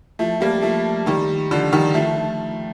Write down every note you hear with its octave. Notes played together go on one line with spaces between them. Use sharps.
F3 A3
G3 A#3
F3 A3
D#3 G3
D3 F3
D#3 G3
F3 A3